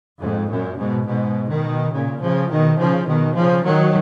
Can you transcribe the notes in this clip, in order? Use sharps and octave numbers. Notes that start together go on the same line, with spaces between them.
F2 G#2
F#2 A#2
G#2 B2
G#2 B2
B2 D#3
A#2 C#3
C#3 F3
B2 D#3
C#3 F3
B2 D#3
C#3 F3
D#3 F#3